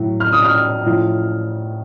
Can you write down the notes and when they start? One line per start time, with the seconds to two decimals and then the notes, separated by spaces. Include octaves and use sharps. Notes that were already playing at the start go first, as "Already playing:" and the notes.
Already playing: A2 F#3
0.20 F6
0.33 D#6
0.44 F6
0.86 A2 F3